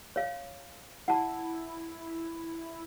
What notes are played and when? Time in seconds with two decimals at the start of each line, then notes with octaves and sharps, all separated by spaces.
0.16 C#5 F5
1.08 E4 F#5 A5